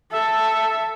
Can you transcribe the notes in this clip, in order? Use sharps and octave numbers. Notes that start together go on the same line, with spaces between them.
A4 E5